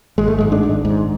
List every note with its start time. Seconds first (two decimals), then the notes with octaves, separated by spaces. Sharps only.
0.18 G#1 G#3
0.28 A3
0.38 G#2 G#3
0.52 D4
0.63 G#1
0.85 G#2